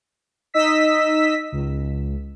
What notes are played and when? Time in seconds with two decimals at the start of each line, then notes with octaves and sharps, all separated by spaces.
0.54 D#4 D#5 E6 B6
1.52 C#2